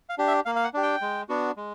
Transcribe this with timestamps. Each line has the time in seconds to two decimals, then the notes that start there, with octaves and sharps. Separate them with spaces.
0.09 F5
0.18 D4 G4
0.28 E5
0.46 A#3 F5
0.56 F5
0.64 F#5
0.74 D4 G4
0.83 G5
1.01 G#3
1.29 B3 D4 F#4
1.57 G#3